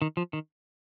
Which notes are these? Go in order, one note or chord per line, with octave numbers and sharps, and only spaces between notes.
D#3
F3
D#3